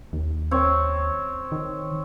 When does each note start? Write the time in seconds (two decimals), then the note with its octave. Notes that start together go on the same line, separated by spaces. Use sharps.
0.13 D#2
0.51 C4 C#5
1.52 D#3